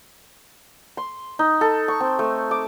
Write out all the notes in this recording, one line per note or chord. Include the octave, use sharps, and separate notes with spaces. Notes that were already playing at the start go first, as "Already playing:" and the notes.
C6
D#4
A4
C#6
C4
A3
D6